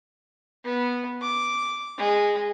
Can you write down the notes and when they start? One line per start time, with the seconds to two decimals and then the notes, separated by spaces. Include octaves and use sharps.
0.65 B3
1.22 D6
1.98 G#3